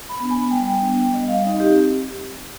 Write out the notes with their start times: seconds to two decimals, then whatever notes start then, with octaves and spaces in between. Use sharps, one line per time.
0.09 B5
0.20 B3 D4
0.31 G#5
0.51 G3 G5
0.83 B3 D4
1.13 G3 D#5
1.28 F5
1.44 C4 D#4 D#5
1.60 G4